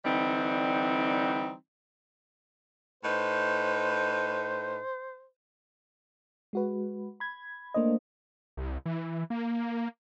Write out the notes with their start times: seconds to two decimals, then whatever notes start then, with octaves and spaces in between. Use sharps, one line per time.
0.05 D3 E3 G3 C4 D#4
3.04 A2 D#4 B4 C5 G6
6.53 G#3 F#4 B4
7.20 B5 G#6
7.74 A3 A#3 D4 C5 D#5
8.57 C2
8.86 E3
9.30 A#3